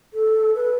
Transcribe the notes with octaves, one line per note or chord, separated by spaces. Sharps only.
A4
B4